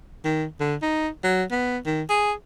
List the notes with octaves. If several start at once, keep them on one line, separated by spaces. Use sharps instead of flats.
D#3
D3
D#4
F#3
B3
D#3
G#4